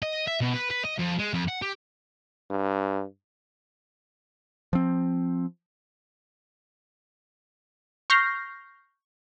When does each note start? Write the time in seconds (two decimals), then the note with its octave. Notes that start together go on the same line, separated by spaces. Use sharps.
0.03 D#5
0.27 E5
0.41 B2
0.54 B4
0.71 B4
0.85 D#5
0.99 F2
1.19 G#3
1.34 F2
1.48 F#5
1.62 G4
2.50 G2
4.73 F3 C4
8.10 C#6 F6 G6 A#6 C7